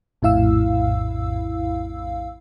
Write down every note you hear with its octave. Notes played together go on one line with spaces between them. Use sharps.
A#1 F2 A2 E4 F5 E6